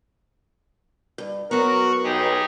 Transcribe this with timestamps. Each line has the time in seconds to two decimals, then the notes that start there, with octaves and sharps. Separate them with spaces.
1.18 G2
1.51 F#3 B3 F#4 A#4 C#6 F#6
2.04 B1 D#4 G4 G#4